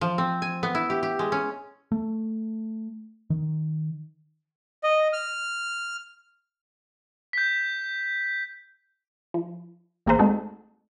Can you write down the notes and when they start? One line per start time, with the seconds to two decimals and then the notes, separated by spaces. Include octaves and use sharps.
0.01 F3
0.18 C4
0.42 G#5
0.63 B3
0.75 E4
0.90 G4
1.03 G4
1.19 G#3
1.32 C#4
1.92 A3
3.30 D#3
4.83 D#5
5.13 F6
7.33 G6 B6
9.34 F3
10.06 A1 A#3 G#4 A#4 C5
10.19 G#3 A3 C4 D#4 F#4 A4